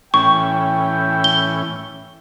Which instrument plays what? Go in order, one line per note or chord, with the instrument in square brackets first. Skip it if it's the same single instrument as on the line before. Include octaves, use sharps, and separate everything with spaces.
[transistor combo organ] A2 E3 C#4 [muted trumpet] G5 [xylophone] C#6
[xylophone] G7